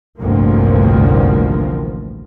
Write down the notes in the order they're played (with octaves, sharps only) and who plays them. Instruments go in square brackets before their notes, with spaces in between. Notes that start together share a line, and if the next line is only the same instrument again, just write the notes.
[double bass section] A1 D2 G2 C3 F3 A#3